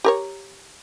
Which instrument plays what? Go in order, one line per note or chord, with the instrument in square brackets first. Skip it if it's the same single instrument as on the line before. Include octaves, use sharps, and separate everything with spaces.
[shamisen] G4 A#4 C#5